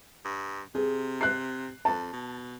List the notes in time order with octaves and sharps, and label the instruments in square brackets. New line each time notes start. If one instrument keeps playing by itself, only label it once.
[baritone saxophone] G2
[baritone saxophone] C3 [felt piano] G#4
[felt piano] F#6 C7
[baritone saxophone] F2 [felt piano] A5
[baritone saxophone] B2